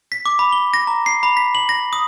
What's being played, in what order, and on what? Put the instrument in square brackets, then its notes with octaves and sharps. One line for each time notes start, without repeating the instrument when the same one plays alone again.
[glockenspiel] B6
D6
B5
G7
A#6
A#5
C7
B5
B6
F#7
A#6
D#6